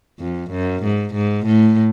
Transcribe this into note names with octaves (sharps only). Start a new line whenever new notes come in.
F2
F#2
G#2
G#2
A2